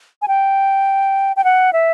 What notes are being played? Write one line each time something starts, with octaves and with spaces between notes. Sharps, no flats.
G#5
G5
G5
F#5
E5